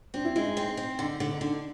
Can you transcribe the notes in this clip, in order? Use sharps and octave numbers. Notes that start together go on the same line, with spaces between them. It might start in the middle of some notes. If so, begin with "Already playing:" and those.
C4 D4
E4
G#3 E4
D#4
C4
C4
D3 D#4
D3
D#4
D3 D4